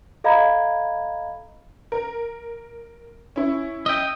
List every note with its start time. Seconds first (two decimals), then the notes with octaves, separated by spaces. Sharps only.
0.24 A4 D#5 F5 A#5 B5 G#6
1.92 A#4
3.36 C#4 E4
3.86 D#5 E5 G5 D#6